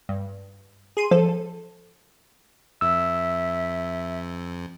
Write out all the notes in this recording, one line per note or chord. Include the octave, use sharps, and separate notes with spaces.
G2
G#4 C6 D#7
F3 A4
F2 E5 E6